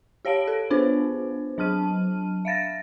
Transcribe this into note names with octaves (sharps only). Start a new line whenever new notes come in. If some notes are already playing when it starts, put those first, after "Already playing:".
G4 C#5 F5 A5 D7
A4 C#5
B3 D4 F4 B4 C5
F#3 D4 A5 F6 D#7
E5 F5 A6 A#6